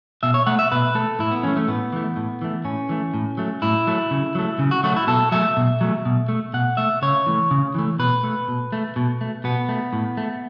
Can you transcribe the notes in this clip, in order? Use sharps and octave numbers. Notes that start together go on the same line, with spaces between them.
B2 E5
C#5
A3 F#5
E5
B2 B4
A3 A4
A2 E4
B3
E3 A3 C#4
A3
A2 B3
E3 A3
A2
E3 A3
A2 C#4
E3 A3
A2
F#3 A3
A2 E4
F#3 A3
C#3
F#3 A3
C#3
F#4
F#3 A3 F#4
E4
B2 A4
F#3 A3 E5
B2
F#3 A3
B2
A3
B2 F#5
A3 E5
C#3 C#5
E3 A3
C#3
E3 A3
B2 B4
A3
B2
A3
B2
A3
B2 B3
A3
A2
A3